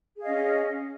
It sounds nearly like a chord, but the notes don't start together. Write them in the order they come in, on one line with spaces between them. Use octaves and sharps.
G#4 F5 D#5 C#4